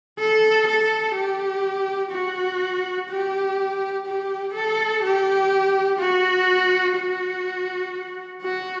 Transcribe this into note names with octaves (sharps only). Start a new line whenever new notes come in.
A4
A4
G4
F#4
G4
G4
A4
G4
F#4
F#4
F#4